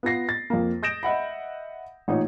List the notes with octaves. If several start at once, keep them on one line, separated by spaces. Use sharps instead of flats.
B3 F4 B4 A#6 C7
A6
F2 A#3
D#6 G6 A#6 D7 E7
D#5 E5 F#5 B5
A1 A#2 D#4 C#5